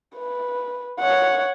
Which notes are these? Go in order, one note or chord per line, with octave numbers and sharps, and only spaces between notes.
B4
C#5 F#5